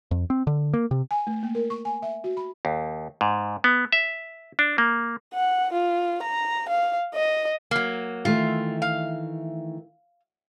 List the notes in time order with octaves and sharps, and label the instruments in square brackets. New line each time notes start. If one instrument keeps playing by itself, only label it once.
[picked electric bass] F2
C4
D3
A#3
C3
[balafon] G#5
A3
A#3
A#4
C#6
G#5
E5
F#4
B5
[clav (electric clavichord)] D#2
G#2
B3
E5
D4
A#3
[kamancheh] F#5
F4
A#5
F5
D#5
[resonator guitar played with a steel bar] F#3 A#3
[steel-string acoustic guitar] D#3 E3 A3 [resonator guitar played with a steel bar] F4
[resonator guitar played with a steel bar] F5